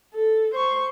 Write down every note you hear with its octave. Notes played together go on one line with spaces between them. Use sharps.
A4
C5 C#6